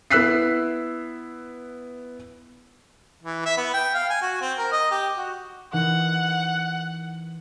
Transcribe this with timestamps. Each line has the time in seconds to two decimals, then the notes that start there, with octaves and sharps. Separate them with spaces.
0.11 B3 E4 E6 F#6 B6 C7
3.23 E3
3.46 E5
3.58 B3
3.74 G5
3.94 F5
4.10 G#5
4.22 F#4
4.41 C4
4.59 A#4
4.72 D#5
4.91 G4
5.17 F#4
5.73 E3 D#4 A#4 F#5